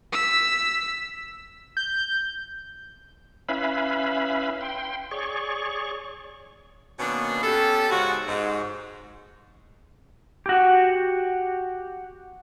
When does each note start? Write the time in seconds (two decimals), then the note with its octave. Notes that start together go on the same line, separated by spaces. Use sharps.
0.13 E6 B6
1.77 G6
3.49 C#4 E4 B4 E5 F5 B5
4.61 G5 C6
5.11 G#4 C#5 D5 C#6
7.00 B2 D#3 A#3 B3 C#4 D4
7.43 B3 C#4 G4 A4
7.91 G#2 C#3 F#4
8.28 G#2
10.46 F#4 G4